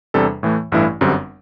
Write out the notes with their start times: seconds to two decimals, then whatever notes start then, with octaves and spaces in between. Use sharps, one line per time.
0.14 E2 C3 G3 D4 A4
0.43 A2 E3 A3
0.72 A1 G2 E3 A3 E4
1.01 G1 F#2 D3 G3 C4